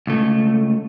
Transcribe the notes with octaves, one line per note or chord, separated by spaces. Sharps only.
C#2 A3